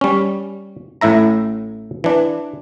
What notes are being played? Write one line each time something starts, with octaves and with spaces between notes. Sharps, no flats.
G3 C#4
A1 A2 E4 E5 A#5
E3 D4